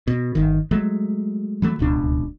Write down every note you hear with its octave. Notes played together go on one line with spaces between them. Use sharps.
B2
G1 D#3
F#3 G#3 A3
E3 F#3 A3
D1 C#2 B2 D4